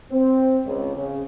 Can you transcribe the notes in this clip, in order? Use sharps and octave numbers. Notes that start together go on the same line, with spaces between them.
C4
C#2
C#3